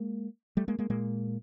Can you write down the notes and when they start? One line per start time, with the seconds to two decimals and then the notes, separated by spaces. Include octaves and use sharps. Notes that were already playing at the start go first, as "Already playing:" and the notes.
Already playing: G#3 A#3
0.57 G3 A3
0.68 G#3 A#3
0.79 G#3 A#3
0.90 A#2 G#3 A#3